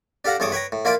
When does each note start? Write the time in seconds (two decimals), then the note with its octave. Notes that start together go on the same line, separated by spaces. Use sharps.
0.25 D4 G4 A4 F5 F#5 A#5
0.40 E2 G2 A4 C#5 D6 D#6
0.52 B4 C#5 G5 A#5
0.72 A2
0.85 A#3 E4 F4 D5 F5 G5